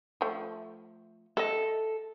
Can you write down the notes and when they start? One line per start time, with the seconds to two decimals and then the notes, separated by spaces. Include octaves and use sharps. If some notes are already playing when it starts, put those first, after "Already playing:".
0.21 F3 A3
1.37 A4 D#5 E5